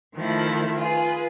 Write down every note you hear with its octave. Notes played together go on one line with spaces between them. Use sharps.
D#3 F3 A3 E4
F4 G#4 B4